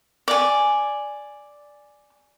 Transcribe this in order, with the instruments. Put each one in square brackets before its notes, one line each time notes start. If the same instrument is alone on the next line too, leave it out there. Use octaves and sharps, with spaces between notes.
[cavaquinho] D5 G#5